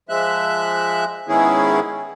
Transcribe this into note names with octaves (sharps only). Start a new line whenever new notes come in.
F3 G#3 E5 F#6
G#2 D#3 B3 C#4 E4 G#4